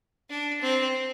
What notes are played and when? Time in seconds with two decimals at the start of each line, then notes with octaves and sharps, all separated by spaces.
0.29 D4
0.61 C4